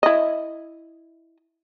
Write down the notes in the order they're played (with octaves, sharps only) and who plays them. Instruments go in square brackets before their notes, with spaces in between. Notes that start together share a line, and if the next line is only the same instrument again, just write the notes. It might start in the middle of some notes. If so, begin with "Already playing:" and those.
[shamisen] E4 D#5